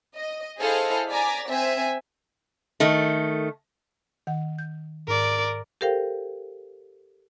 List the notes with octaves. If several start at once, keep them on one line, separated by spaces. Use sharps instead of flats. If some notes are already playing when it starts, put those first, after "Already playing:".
D#5
E4 G#4 A4 C5 D#5 F5
D5 G#5 A#5 D6 A6 B6
C4 C5 E5 G#5
D#3 A3
D#3 F#5
G6
G#2 A#4 D5
G4 A4 A#4 C5 F5 G5